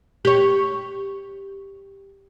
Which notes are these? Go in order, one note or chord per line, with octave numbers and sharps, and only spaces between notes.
G4 C#5